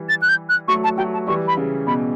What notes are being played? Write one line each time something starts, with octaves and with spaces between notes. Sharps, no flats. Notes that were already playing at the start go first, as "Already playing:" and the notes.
Already playing: E3 G3
A6
F#6
G6
F#6
F#3 A3 C#6
A5
F#3 A3 G5
A5
E3 G3 C#6
B5
C#3
B2 B5